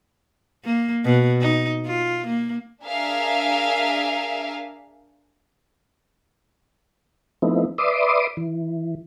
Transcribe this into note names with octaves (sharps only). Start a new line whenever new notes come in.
A#3
B2
D#4
F4
A#3
D4 G#4 A#4 E5 F5
F3 A3 B3 C4 D#4 E4
B4 D5 E5 C6 D6 D#6
E3